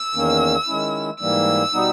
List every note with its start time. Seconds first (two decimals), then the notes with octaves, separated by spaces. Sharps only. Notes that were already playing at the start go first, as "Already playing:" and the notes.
Already playing: E6
0.14 E2 D#3 A#3 C#4
0.67 D#3 G#3 C#4 E4
1.20 G#2 E3 G3 A#3 E6
1.74 B2 G3 B3 D#4